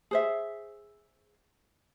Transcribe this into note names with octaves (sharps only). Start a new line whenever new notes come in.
G#4 C5 E5